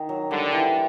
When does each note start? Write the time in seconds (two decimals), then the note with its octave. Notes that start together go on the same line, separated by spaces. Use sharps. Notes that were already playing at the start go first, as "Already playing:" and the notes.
Already playing: D#3
0.09 F#3
0.30 D3 G3
0.52 E3